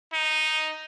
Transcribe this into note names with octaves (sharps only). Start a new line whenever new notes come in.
D#4